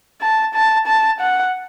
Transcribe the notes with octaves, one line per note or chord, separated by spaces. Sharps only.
A5
A5
A5
F#5